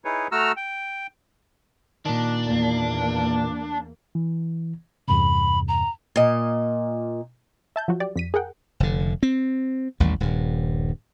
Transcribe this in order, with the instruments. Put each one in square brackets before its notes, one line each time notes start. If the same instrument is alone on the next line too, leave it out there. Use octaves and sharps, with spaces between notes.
[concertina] D#4 E4 G#4 B4 C#5
A3 F#4 A#5 E6 F6
G5
[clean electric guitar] A#2 D#3 [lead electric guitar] D4
[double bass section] E2 A#3
[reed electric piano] E3
[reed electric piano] E2 G2 C3 [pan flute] B5
[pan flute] A#5
[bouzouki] A#2 D#5
[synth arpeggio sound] E5 A5 G6
F3 F#3 F4 F#4
G4 D5
F2 B6 D#7
G#4 A#4 F#5 G5
[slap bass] F1 D3
C4
A1 D#2 G3
D#1 G2